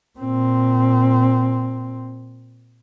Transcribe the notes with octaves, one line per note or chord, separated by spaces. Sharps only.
A#2 C4